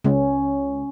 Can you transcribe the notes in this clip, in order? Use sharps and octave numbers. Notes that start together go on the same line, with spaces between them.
C#2 C#4